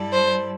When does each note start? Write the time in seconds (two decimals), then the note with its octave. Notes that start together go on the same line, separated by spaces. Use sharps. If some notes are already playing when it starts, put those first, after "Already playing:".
Already playing: G2 G3 E4 A4 D5
0.13 C5